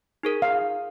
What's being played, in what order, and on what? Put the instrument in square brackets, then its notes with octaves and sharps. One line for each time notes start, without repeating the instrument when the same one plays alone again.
[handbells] D#4 G#4 A#4
[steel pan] F5